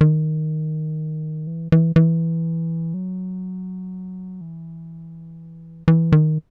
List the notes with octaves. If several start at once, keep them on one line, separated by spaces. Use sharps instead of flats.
D#3
E3
E3
E3
F#3
E3
E3
D#3